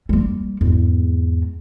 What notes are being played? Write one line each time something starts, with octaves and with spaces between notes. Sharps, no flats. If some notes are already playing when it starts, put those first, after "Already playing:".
G3 A#3
E2 G#2